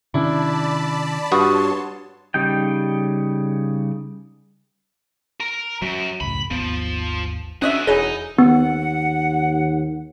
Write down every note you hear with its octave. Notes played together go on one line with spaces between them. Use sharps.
C3 D#3 C#4 D4 E4 D5 A5 B5
G2 F#4 B4 C#5 A5 C6 D#6
C#3 G3 D#4 G5
A#4 A#5
F#2 F#3
C#2 F#2 A2 B5
G#1 D#2 F3 B3
B3 C#4 D4 F#4 G#4 D#5 E5
E1 F#3 D#4 E4 G#4 C#5 G#5
D#2 B3 F#5